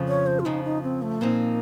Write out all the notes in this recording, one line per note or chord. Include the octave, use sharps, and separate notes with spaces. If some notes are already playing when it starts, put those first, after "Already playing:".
Already playing: F2 C#3 F3
C#5
C5
F4
F2 C#3 F3 D#4
D#4
C4
A3
A#2 F3 A#3 C4 D#4